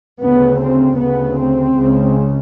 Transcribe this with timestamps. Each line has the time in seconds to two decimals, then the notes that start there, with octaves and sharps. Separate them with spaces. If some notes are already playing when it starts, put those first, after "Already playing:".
0.21 D2 C#3 B3
0.59 C4
0.99 D2 C#3 B3
1.38 C4
1.76 C#2 C#3